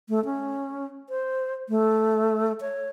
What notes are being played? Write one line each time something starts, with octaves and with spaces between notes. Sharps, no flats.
A3
C#4
C5
A3
C#5